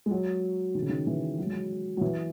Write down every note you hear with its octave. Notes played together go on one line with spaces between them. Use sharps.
G#3
F#3
D#3
C#3
D#3
E3
F#3
G#3
F#3
F#3
E3